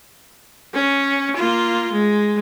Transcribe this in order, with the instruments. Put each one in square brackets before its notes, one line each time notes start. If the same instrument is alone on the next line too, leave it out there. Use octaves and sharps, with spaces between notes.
[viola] C#4
A#3 F4
G#3